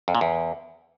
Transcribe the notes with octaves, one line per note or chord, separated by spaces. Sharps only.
F2
A#2
E2